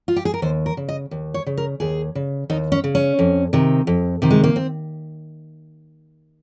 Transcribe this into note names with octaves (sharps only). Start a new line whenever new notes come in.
F4
G4
G#4
A#4
D#2 C5
A#4
C#3
D#5
D#2
C#5
C#3
A#4
D#2 G#4
C#3
D#2 D#4
C#4
C#3
C#4
F2
C3 D#3
F2
C3 D#3
G#3
A#3
C4